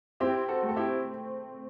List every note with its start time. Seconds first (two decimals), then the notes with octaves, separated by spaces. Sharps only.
0.20 C4 E4 G4
0.48 F#4 A4
0.63 A3
0.69 A4
0.76 E4 G4